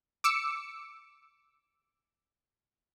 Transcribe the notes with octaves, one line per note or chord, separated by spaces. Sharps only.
D6 E6 C#7